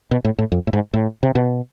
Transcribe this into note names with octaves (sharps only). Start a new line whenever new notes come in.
B2
A2
A2
F2
A2
G#2
A2
C3
B2